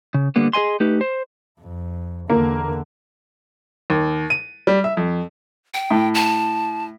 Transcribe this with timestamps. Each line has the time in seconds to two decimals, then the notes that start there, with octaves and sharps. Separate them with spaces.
0.14 C#3
0.36 D3 G3 A#3 B3
0.53 G#4 A#4 D#5 G#5 C6
0.80 A3 D#4 G4 B4
1.01 C5
1.59 F2
2.30 E2 D3 A#3
3.90 D#2
4.30 D#7
4.67 G3
4.84 E5
4.97 F2
5.74 G5
5.91 A2
6.15 A5